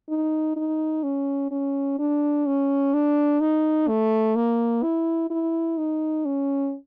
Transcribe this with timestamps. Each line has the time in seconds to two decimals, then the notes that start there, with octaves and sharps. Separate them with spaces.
0.09 D#4
0.56 D#4
1.03 C#4
1.51 C#4
1.99 D4
2.46 C#4
2.94 D4
3.41 D#4
3.88 A3
4.36 A#3
4.83 E4
5.30 E4
5.77 D#4
6.25 C#4